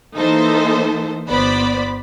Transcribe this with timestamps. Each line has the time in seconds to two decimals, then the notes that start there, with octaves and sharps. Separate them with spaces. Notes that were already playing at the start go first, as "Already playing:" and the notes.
0.16 E3 A#3 D#4 A4 C5
1.28 G1 B3 C5 D5 B5